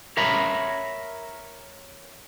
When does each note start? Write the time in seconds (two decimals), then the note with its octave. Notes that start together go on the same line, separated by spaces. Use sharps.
0.17 A#4 C#5 E5 A#5 B5